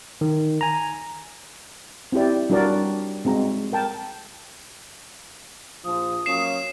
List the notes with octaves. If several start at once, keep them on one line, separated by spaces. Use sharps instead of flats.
D#3
G#5 A#5
C4 E4 G4 D5
G3 D4 F#4 A#4 D5 A#5
G#3 C4 F#4 A#5
A#4 G5 A5
A#1 F3 D#6
F#3 A#3 C#4 C7 E7